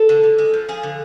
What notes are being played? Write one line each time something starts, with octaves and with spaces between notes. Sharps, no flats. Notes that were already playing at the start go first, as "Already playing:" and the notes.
Already playing: A4
D3
D3
G#3
F3
F3 G#4
D3